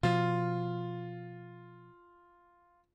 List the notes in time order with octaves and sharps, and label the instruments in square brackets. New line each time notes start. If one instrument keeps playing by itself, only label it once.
[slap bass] B2 F3 [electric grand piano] F4